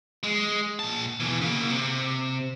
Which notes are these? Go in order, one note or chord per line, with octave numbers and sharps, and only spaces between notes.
G#3
A#2 A5
B2 E3
C#3 A#3
C3